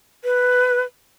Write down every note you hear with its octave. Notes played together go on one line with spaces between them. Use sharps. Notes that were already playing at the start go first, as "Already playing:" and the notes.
B4